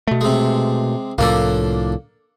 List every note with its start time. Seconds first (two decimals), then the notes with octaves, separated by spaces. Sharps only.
0.07 B2 A3
0.21 C3 G#3
1.18 C2 A2 F3 A#3 D4 A4